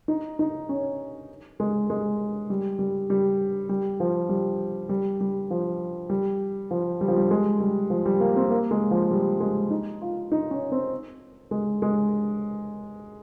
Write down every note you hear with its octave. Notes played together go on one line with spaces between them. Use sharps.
D#4
D#4
C#4
G#3
G#3
G3
G3
G3
G3
F3
G3
G3
G3
F3
G3
F3
G3
F3
G3
G#3
G3
F3
G3
A#3
C4
A#3
G#3
F3
G3
G#3
D#4
F4
D#4
C#4
C4
G#3
G#3